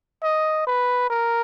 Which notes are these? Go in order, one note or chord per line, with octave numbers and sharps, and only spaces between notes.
D#5
B4
A#4